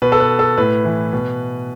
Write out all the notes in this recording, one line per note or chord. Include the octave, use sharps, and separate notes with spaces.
B2 B4
A4
B4
A4
A2 B4
E3
B2